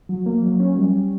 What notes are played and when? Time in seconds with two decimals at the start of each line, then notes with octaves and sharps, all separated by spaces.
0.09 F#3
0.26 A#3
0.43 F#3
0.60 C#4
0.77 G3
0.94 G3